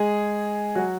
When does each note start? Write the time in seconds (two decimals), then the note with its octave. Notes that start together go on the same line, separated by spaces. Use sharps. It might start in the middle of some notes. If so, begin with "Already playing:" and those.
Already playing: G#3 G#4
0.75 F#3 F#4